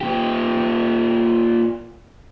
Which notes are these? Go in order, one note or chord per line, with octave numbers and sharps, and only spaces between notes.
A#2 G4